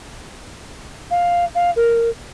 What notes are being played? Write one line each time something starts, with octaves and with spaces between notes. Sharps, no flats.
F5
F5
A#4